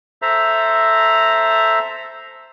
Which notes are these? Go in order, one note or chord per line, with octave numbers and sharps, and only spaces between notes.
A4 C5 E5 A#5